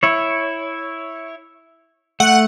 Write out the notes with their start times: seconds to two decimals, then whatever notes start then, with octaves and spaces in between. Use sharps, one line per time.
0.03 E4 C#5
2.20 A3 F#5